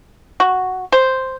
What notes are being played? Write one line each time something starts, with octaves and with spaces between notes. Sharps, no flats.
F#4
C5